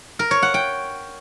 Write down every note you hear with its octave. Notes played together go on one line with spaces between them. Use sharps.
A#4
C#5
F#5
G5